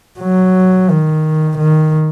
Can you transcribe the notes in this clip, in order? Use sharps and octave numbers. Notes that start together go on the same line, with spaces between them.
F#3
D#3
D#3